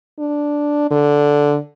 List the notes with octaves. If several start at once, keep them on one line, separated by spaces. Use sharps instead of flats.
D4
D3